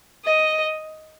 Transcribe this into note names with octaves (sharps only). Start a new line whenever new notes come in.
D#5